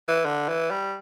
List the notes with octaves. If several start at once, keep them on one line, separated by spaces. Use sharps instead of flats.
E3
D3
E3
G3